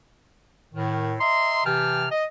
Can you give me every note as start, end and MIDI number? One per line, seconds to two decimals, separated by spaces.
0.74 1.14 45
0.74 1.14 51
1.20 1.65 75
1.20 1.65 76
1.20 1.65 82
1.20 1.65 84
1.65 2.07 48
1.65 2.07 52
1.65 2.07 67
1.65 2.07 79
1.65 2.07 81
1.65 2.07 89
2.11 2.25 75